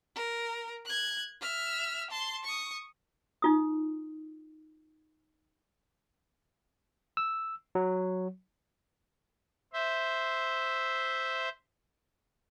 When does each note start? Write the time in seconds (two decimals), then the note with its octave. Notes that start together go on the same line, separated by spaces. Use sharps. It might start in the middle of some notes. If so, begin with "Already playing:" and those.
0.15 A#4
0.85 F#6 G#6
1.41 E5 F6
2.10 A5 C6
2.44 C#6 D#6
3.42 D#4 F4 D#6
7.17 E6
7.75 F#3
9.73 C5 E5